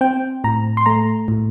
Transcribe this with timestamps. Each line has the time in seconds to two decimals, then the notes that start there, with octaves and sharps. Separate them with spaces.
0.01 C4 G5
0.44 A2 A#5
0.77 C6
0.86 A3 A#5
1.28 A2